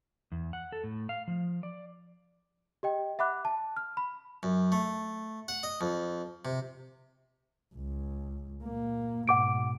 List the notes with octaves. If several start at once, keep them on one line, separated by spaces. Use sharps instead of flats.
E2
F#5
A4
A2
F5
F3
D5
G4 D#5 G5
E5 F#5 B5 D6 F#6
A5
F6
B5
F#2
A3
F#5
D#5
F2
C3
C#2
A#2 A#3
G#2 B2 F#5 D6 D7